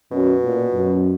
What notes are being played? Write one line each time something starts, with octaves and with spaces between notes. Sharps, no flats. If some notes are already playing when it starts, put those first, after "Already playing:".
F#2 B2
A#2
F#2